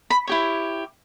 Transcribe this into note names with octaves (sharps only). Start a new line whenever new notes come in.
B5
E4 G4 C#5